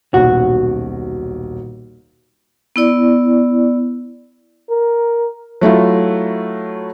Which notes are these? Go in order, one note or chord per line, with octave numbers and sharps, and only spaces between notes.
D#1 B1 F#4
B3 E4 D5
A#4
F#3 A3 E4 F4